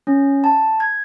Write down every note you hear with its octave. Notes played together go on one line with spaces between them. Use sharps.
C#4
A5
G#6